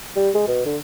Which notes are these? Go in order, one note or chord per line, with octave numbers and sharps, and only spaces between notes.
G3
G#3
B2
D3